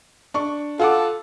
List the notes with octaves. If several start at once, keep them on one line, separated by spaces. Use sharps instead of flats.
D4 C#6
F4 A4 F#5 D6